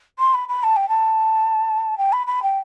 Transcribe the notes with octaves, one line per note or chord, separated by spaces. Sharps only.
C6
B5
B5
A5
G5
A5
G5
B5
B5
G5